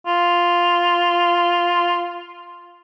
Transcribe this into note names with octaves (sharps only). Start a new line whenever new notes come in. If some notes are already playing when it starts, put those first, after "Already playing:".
F4